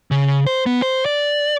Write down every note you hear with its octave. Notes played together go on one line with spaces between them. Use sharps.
C#3
C5
B3
C5
D5